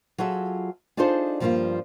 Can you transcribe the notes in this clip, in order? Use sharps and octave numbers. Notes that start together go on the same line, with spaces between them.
F#3 F4 G#4 A4 E5
D4 D#4 F4 G#4 A4 C5
G2 F3 G3 G#3 A#3 F4